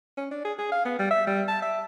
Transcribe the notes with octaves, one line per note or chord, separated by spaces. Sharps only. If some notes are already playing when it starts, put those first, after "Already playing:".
C#4
D4
G#4
G#4
F5
B3
G3
E5
G3
A5
E5